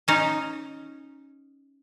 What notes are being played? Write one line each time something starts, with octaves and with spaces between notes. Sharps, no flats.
C#4 D#4